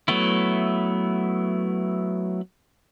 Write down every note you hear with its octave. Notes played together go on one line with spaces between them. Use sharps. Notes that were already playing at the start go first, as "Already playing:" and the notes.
F#3 A3 B3 E4